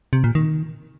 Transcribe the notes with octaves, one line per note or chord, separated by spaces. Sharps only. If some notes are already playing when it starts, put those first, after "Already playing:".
C3
A#2
D#3